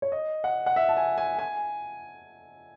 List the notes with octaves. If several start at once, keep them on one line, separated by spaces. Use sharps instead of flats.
C#5
D#5
F#5
F#5
E5
A5
G#5
G#5
G#5